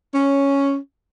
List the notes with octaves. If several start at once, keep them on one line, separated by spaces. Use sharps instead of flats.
C#4